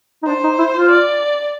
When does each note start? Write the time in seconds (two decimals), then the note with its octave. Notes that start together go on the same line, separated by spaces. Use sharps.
0.23 D#4
0.27 D4 C5
0.44 D#4
0.58 E4
0.74 F4
0.91 D5